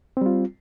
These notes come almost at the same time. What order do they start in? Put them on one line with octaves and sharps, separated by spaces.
C4 G3 F4